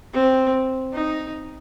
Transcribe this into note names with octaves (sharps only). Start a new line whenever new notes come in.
C4
D#4